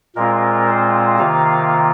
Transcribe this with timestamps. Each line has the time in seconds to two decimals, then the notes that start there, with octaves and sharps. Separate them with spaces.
0.15 A#2 G#3 C4 F4 A#4
0.68 C5
1.18 C3 D#3 A#3 F4 F5